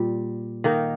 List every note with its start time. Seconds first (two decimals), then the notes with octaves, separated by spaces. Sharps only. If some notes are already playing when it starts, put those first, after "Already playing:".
Already playing: A#2 G3
0.64 D#3 A#3 D#4 A#4